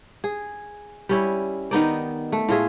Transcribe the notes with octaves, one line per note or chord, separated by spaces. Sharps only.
G#4
G3 C#4 E4
D#3 B3 D#4 D5
A3
A2 F4 G#4 E5